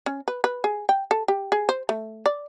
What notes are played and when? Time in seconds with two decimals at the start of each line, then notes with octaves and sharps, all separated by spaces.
0.06 C#4
0.28 B4
0.44 B4
0.64 G#4
0.89 G5
1.11 A4
1.28 G4
1.52 G#4
1.69 C5
1.89 A3
2.26 D5